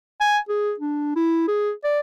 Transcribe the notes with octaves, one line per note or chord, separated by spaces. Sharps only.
G#5
G#4
D4
E4
G#4
D5